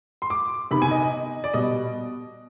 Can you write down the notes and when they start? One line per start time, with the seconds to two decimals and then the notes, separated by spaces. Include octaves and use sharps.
0.22 C6
0.30 D6
0.71 C3 D#3 B3 B5
0.82 G#5
0.91 D#5
1.03 D#5
1.44 D5
1.54 B2 G3 B3 D#5